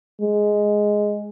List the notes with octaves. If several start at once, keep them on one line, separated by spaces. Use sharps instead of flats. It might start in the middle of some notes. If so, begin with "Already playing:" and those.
G#3